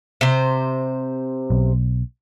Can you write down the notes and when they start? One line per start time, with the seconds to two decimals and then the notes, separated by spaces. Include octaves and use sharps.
0.21 C3 C5
1.50 B1